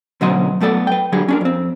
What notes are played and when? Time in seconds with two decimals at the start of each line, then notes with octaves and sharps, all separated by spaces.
0.21 D2 B2 F#3 C#4 C5 D#5
0.61 F#3 A3 B3 A4 D5
0.87 B4 G5
1.12 D3 F#3 G3 G#4
1.28 C#4 D4 A#4
1.41 F2 C4